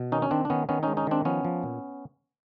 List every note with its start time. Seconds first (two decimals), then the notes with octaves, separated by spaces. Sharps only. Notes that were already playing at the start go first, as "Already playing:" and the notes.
Already playing: B2
0.12 D#3 C#4 D#4
0.22 C#4
0.31 D#3 C4 D4
0.45 D4
0.50 D#3 B3 C#4
0.69 D#3 B3 C#4
0.83 G#3 C#4 D#4
0.97 C#4 D#4
1.07 D#3 C4 D4
1.25 F3 B3 C#4
1.44 F3
1.63 A#2